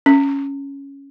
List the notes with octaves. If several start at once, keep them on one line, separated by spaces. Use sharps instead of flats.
C#4